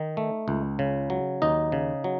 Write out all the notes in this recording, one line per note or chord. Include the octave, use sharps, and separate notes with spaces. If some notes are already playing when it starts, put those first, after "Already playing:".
Already playing: D#3 D#4
A3
C#2
C#3
F#3
D#2 D#4 D#5
C#3
F#3